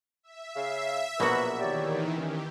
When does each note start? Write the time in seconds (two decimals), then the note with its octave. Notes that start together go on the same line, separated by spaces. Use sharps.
0.23 E5
0.56 C#3 F5
1.20 A#1 B2 F#3 A#3 F#4 B4
1.60 D#3 E3 G4 C#5 D5
2.18 C2 C#4 G4